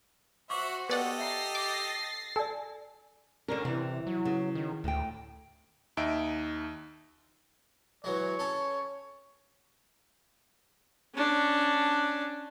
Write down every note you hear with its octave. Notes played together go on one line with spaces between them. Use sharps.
F#4 C5 E5 F#5 C#6 D6
B3 G4 A4 A#4 D5 D#5 F#5
E5 A#5 A6 A#6 C7
D6
A4 D5 G#5
D3 C#4 D4 A#4
C3 E3
F#3
C#3
D#3
D2 A2 G5
D#2 D#4 E5 D7
E3 F#3 G#3 C#5
C#4 A4
C#4 D4